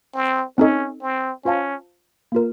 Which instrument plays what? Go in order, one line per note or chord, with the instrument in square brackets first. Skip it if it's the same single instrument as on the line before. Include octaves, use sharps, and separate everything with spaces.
[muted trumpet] C4
[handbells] C4 D#4 A4 D#5 [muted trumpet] C#4
[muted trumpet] C4
[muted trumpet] C#4 [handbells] F4 C5 F5 A5
[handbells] A#3 F4 A#4